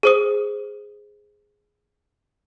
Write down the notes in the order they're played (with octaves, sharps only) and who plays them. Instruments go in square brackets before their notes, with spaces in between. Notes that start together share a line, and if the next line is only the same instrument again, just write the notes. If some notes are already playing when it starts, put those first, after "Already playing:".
[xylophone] G#4 C5 D#6